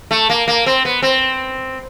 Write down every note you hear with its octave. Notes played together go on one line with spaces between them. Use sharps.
A3
A#3
A#3
C4
B3
C4